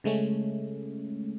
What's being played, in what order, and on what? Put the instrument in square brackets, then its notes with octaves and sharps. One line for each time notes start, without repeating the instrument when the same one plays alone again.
[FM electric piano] C#3 G#3 A3 C#4